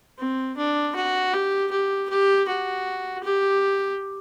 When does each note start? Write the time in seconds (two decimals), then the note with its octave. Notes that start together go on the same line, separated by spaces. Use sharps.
0.18 C4
0.57 D4
0.96 F#4
1.33 G4
1.71 G4
2.10 G4
2.48 F#4
3.23 G4